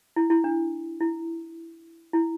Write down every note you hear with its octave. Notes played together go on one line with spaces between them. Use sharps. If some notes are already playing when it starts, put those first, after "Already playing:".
E4
E4
D4
E4
E4